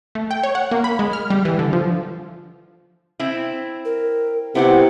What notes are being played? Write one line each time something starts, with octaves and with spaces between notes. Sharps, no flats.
A3
G5
C#5
F#5
A#3
B5
G#3
F6
G3
E3
D3
F3
C4 E4
A#4
C3 B3 E4 G4 F#5